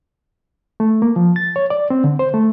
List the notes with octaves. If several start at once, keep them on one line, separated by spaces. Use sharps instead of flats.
A3
A#3
F3
A6
C#5
D5
C4
D3
C5
A3